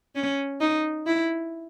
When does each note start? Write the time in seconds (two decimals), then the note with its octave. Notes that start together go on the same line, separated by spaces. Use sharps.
0.15 C#4
0.61 D#4
1.06 E4